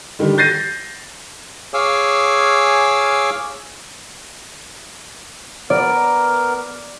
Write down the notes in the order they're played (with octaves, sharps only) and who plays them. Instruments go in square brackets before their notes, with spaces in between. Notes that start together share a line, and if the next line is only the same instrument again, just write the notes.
[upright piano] D3 D#3 G3
G6 A6 A#6 C7 D#7
[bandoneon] G#4 C#5 F5 G#5 D6 E6
[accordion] B3 A#4 [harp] D5